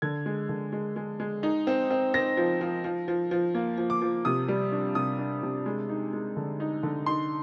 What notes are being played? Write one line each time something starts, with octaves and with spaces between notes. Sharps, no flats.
D3 G#6
G#3
D3
G#3
G#3
G#3
D#4
C4
C4
C4 A#6
F3
F3
F3
F3
F3
A#3
F3
D6
F3
C3 D#6
G3
D4
C3 D#6
D4
C3
G#3
D#4
G#3
D3
D#4
D3
D#4 C6